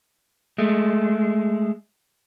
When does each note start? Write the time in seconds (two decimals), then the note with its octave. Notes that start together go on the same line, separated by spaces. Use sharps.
0.58 G#3 A3